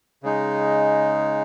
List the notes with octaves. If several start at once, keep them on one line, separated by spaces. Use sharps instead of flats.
C#3 G#3 D#4